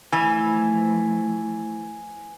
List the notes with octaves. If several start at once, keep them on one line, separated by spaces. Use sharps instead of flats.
E3 F3 A3 G#5